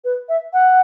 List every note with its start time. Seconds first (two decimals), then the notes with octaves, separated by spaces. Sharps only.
0.04 B4
0.29 E5
0.53 F#5